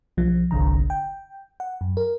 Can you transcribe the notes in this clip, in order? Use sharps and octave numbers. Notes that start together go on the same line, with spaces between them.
B1 F3
G1 C2 D3 A#5
G5
F#5
F#2
A#4